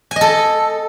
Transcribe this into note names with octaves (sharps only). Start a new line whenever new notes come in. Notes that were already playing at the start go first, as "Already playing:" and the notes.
A4 D#5 G#5